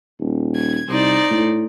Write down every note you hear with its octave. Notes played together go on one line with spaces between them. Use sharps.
D#1
G#6
C2 D#4 C5 D5
A2